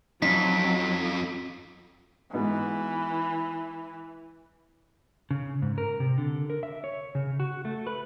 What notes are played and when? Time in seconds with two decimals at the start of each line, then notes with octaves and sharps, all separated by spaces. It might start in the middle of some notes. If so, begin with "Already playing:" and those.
0.22 F2 F#3 C#4 D#4 B6
2.34 G#2 E3 B3 F#4
5.31 C#3
5.62 G#2
5.78 A#4
6.00 C3
6.18 D3
6.50 A#4
6.63 E5
6.84 C#5
7.15 C#3
7.40 F#4
7.65 A3
7.87 B4